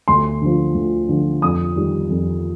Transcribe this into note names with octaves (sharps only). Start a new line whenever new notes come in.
D2 C6
D3 F3
D2
D3 F3
F2 D#6
D#3 G3
F2